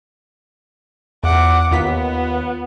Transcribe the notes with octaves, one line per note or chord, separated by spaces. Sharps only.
E2 F#5 D6
D#2 B3 F4 B6